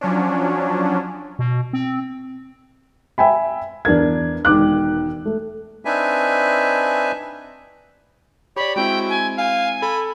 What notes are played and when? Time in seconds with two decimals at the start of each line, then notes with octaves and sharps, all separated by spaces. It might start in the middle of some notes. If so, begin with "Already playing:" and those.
0.01 F3 F#3 C#4 D4
1.39 B2
1.73 C4
3.18 E5 G5 G#5 B5
3.85 E2 D4 A#4 G#6
4.45 E1 D#3 D6 F#6
5.26 A3
5.85 C4 D4 D#4 B4 E5 G#5
8.56 G4 C#5 D5 B5
8.76 G#3 C4 E4 F#4 G5
9.09 G#5
9.38 F5 G#5
9.82 A4 B5